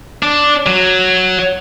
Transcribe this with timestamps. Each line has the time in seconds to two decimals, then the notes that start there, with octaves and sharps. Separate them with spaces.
0.23 D4
0.67 F#3